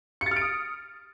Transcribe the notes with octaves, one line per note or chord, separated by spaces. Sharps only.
C#7
A6
F6
D7
D#6